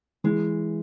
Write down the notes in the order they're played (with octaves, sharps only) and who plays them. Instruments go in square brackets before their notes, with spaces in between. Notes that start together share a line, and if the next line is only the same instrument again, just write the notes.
[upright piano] E3 [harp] G#3